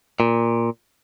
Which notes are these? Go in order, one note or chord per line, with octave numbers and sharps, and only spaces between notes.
A#2